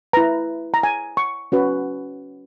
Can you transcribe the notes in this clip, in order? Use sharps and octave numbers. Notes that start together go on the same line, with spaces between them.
E4 B4 A#5
A#5
G#5
C#6
C#4 F#4 B4